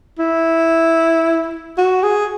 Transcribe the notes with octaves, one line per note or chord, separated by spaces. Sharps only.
E4
F#4
G#4